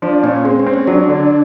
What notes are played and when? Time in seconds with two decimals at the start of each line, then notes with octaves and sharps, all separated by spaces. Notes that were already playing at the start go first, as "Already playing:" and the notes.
0.02 F3 D4
0.23 A#2 C#4
0.44 G#3 C4
0.59 C#4
0.67 C4
0.74 C#4
0.87 F#3 D4
1.09 D3